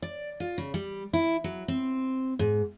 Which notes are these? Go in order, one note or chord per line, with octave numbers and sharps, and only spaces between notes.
D5
F4
C#3
G3
E4
F#3
C4
G#2